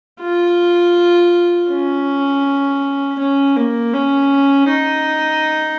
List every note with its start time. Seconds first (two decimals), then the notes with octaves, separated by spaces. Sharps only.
0.21 F4
1.70 C#4
3.19 C#4
3.57 A#3
3.94 C#4
4.69 D#4